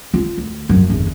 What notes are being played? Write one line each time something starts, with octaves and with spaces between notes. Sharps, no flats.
F4
D2
F#2
G1 E2